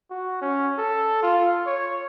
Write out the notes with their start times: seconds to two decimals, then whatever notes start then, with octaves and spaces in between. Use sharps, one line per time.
0.11 F#4
0.42 C#4
0.78 A4
1.23 F4
1.66 C#5